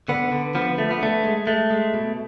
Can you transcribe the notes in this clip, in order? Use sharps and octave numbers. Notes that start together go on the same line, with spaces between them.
D3 B3
D3
F3 B3
D3 A3
B3
D3 A3
G#3
G#3 A3
G#3
B2